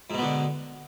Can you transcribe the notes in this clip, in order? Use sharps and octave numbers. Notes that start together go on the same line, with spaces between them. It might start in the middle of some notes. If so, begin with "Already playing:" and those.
G#2 B2 D3 B3